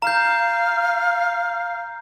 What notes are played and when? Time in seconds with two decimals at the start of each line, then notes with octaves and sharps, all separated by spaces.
0.02 F5 A#5 G6